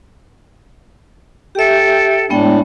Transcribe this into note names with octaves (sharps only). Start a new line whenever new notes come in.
G4 A4 E5 G5
A2 G#3 B3 D4 G5